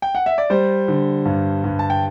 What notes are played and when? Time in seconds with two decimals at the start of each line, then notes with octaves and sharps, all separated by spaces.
0.02 G5
0.15 F#5
0.26 E5
0.38 D5
0.50 G3 C5
0.88 D3
1.25 G2
1.64 G2
1.79 A5
1.90 G5